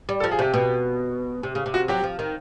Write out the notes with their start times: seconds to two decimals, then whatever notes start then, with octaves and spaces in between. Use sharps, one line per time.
0.09 G3
0.20 A4
0.24 F3
0.31 G#4
0.39 C3 G4
0.54 B2
1.43 C3
1.55 C#3
1.66 C3
1.74 F#4
1.88 F#3 G4
2.04 F3
2.19 D#3